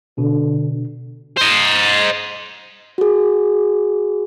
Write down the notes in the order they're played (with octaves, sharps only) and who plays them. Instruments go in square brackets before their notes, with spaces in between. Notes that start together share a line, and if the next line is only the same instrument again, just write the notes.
[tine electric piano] B2 [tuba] D3
[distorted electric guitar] C5 D#5
[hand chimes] F#4 G#4